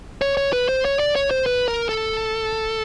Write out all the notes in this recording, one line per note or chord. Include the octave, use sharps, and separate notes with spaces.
C#5
C#5
B4
C5
C#5
D5
C#5
C5
B4
A#4
A4